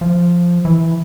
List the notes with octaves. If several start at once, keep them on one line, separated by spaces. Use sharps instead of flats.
F3
E3